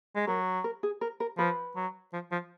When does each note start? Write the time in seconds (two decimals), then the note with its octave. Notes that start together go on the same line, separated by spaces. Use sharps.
0.16 G#3
0.27 F#3 A#4
0.64 A#4
0.83 G#4
1.01 A#4
1.20 A#4
1.38 F3 B4
1.76 F#3
2.13 F3
2.32 F3